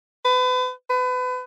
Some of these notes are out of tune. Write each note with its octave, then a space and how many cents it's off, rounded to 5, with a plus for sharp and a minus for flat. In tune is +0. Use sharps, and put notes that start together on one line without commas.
B4 +35
B4 +30